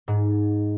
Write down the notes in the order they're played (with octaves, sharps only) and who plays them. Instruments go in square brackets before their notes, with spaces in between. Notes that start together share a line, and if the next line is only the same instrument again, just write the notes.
[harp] G#2